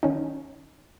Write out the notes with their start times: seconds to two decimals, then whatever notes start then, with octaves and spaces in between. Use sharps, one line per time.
0.03 D#3 C#4 D#4